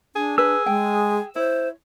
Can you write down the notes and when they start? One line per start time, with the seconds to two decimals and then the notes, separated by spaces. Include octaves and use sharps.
0.15 D4 G#4
0.38 G#4 B4 E6
0.66 G#3 G5
1.36 E4 C5 C#5